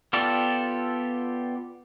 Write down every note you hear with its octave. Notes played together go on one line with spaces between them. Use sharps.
B3 F4 G4 A4 D5